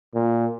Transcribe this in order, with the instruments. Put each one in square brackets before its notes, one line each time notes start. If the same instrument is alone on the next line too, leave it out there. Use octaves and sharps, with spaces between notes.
[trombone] A#2